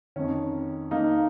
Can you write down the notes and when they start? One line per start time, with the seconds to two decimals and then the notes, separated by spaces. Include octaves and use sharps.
0.16 F2 D#3 C#4
0.91 A#3 D#4